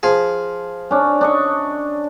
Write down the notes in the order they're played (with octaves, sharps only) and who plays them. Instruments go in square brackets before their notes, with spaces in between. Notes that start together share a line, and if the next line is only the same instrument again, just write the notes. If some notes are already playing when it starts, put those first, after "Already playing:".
[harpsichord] F3 G#4
[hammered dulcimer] C#4 D4
D4 D#5 C#6